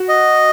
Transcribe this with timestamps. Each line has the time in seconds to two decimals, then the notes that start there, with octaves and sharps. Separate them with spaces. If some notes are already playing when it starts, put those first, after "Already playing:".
Already playing: F#4
0.09 D#5